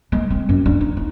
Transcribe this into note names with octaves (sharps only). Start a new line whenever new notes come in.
G#3
C4
F#2
D4
D#4
D#4